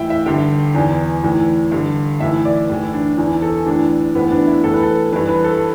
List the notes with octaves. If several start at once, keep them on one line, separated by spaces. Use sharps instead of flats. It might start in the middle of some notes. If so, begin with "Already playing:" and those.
Already playing: A2 E3 E5 G5
E5
G2 D3 G5
E2 E3
A2 E3
G2 D3
A2 E3 E5
D5
A2 E3
D4
E2 E3
A4
A2 E3 D4
A2 E3 B3
B3
D4
E4
A2 E3 A4
B4
A4
G2 E3 B4
B4
A4